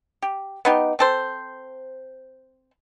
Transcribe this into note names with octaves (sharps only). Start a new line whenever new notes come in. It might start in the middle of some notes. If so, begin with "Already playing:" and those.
G4
B3 D#4 G4
C4 A4 C5